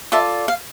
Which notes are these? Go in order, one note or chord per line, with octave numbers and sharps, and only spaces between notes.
F4 A4 D5 E5
F5